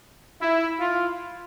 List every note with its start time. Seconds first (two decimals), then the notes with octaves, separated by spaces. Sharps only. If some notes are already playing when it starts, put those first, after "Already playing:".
0.41 E4
0.80 F4